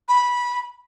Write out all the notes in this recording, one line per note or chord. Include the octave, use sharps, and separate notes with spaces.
B5